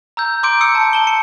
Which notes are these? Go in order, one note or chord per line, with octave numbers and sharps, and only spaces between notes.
A#5 E6 G6
C6 D6 G6 D7
D#6 E6 G6 C#7
A5
A5 G7
A5 C#7